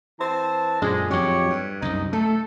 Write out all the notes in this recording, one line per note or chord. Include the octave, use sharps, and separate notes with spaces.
E3 C4 A5
F#2 A#2 D3 G#3
F2 F#3 G4 C#5
G2
C2 F#2 D#4
A3 A4